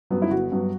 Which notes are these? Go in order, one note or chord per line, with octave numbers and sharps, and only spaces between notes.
G2 F#3 B3
E4
G1 F#4
G2 F#3 B3